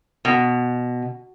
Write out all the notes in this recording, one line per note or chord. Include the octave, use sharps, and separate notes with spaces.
B2